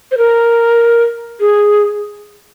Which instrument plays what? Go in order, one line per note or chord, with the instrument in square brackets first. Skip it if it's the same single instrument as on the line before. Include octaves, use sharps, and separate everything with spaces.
[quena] C5
A#4
G#4